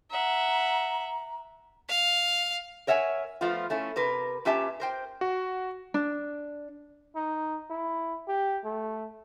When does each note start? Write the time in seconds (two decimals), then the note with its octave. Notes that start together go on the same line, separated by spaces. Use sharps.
0.11 E5 F#5 A#5
1.89 F5
2.87 A#4 C#5 E5 F#5 G#5
3.41 F3 A3 B3 F4
3.70 A3 C#4 E4
3.96 C3 A#4 B4
4.45 A#2 C#4 G4 E5 A5
4.80 A#4 C5 G5
5.21 F#4
5.94 D4
7.15 D#4
7.70 E4
8.28 G4
8.65 A3